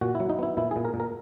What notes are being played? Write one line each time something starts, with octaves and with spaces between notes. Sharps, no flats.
A#2 F#4
F#3 E4
D#4
B3 E4
A#2 E4
A#2 G#4
A#4
A#2
A#4